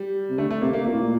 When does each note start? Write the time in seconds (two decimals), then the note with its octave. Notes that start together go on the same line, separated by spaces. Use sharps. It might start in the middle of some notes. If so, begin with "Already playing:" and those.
Already playing: G3
0.30 C3
0.38 D3 A3
0.51 A3
0.61 C3 A#3
0.73 A#3
0.85 A#2 A#3
0.92 A2
1.00 A#2